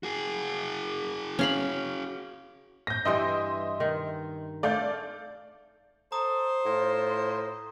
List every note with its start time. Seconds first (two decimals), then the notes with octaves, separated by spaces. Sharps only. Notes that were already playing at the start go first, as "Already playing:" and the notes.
0.03 F#4 G#4
1.39 C#4 F5 B5
2.87 G6 A#6
3.05 G2 E3 D#5 E5 G5 C6
3.80 D#3
4.63 A3 A4 D5 F5 G6
6.12 A4 C5 A#5 D#6
6.66 A2 F4